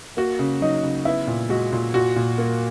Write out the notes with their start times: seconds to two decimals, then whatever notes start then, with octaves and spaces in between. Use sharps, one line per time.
0.17 A#3 F#4
0.39 C#3
0.61 F#3 D#4
0.83 C#3
1.05 B3 E4
1.27 A#2
1.49 G#3 F#4
1.73 A#2
1.94 A#2 F#4
2.16 A#2
2.38 A#3